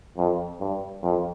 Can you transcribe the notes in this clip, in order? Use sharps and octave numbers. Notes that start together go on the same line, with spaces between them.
F2
G2
F2